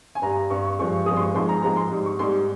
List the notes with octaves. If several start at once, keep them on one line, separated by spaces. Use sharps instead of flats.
G#5
G2 G3 A#5
G2 G3 C#6
C#6
G2 F3 G#3 C#6
G2 F3 G#3 D#6
C6
C#6
G#2 F3 G#3 C6
A#5
G#2 F3 G#3 A#5
C6
G#2 G3
C#6
G#2 G3 C6